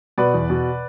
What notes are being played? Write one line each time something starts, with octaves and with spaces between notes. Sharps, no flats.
B2 B4 D5
E2
B2